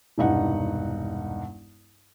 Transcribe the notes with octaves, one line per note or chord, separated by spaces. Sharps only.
E1 C2 G2 D#4 F#5